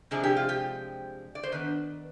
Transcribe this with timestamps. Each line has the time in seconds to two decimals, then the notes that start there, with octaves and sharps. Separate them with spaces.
0.11 C3 F3 G#3 D4 G#4
0.23 G4
0.36 F4
0.49 G4
1.35 D5
1.43 C5
1.52 D#3 B3 D4 B4